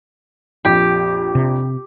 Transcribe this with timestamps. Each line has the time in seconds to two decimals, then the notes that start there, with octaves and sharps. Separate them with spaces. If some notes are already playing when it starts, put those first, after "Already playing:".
0.65 A#1 F2 G4
1.35 C3